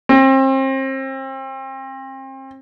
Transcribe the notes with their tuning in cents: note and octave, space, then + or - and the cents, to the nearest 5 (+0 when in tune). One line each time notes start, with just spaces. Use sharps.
C4 +35